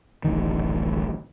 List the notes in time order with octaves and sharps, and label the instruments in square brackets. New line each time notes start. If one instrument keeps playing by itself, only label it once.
[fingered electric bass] D1 A1 D#3